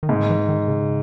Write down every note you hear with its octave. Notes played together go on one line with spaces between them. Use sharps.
D#3
G#2 C#3
E3
D#3
C#3